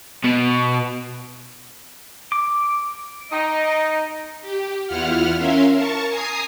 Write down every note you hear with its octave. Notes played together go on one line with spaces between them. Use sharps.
B2
D6
D#4 D#5
G4
E2 E4 F4 F#5 F6
C#4 A#4 E5 F5 C6
A#4 A5 C#6
G#5 A#5 D#6 C7